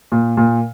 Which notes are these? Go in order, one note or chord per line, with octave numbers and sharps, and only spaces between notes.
A#2
A#2